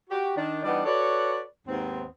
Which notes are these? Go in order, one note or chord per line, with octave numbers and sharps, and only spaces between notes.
F#4 G4
D#3 D4
E3 G3 B3 D4 D#4 D5
F#4 A4 B4 C#5 D5
D#2 G#2 B3 C4